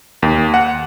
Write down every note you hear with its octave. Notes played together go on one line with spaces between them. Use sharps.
D#2
F#5